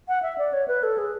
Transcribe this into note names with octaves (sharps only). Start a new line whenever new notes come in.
F#5
E5
D5
C#5
B4
A4
G#4